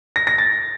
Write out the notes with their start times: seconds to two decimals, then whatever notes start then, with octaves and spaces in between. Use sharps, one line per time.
0.16 A#6
0.27 A#6
0.38 A6